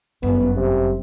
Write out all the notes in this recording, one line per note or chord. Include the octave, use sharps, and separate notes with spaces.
G1 F#2 B3
C3